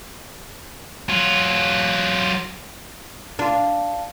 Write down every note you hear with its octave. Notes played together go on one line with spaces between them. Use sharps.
F#3 F4
D4 F4